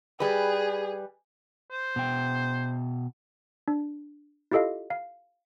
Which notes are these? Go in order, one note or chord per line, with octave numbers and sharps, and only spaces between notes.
G3 G#4 B4
C5
B2 G5
D4
E4 F4 G4 A4 D#5 F5
F5